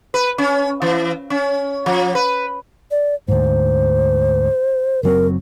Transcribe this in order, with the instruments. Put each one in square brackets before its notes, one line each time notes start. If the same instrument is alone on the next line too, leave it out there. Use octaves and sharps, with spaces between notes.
[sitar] B4
C#4
E3
C#4
F3
B4
[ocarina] D5
[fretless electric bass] D2 G#2 [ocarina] C5
[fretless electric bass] F#1 F#3 C4 [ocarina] A#4